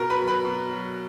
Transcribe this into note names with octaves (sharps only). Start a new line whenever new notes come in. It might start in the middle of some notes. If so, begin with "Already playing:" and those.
Already playing: B2 A#4 A#5
B4 B5
F#3
B4 B5
B2
F#3